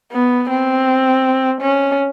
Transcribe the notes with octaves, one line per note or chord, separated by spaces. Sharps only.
B3
C4
C#4